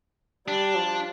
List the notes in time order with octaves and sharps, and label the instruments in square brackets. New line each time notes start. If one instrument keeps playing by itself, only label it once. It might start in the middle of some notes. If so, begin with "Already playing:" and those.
[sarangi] G3 [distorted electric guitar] D4
[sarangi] F3